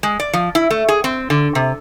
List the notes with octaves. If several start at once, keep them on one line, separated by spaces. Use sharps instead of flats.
G#3
D5
F3
E4
A3
G#4
C4
D3
C3